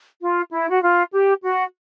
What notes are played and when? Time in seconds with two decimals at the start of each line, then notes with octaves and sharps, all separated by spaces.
0.20 F4
0.51 E4
0.70 F#4
0.81 F4
1.12 G4
1.42 F#4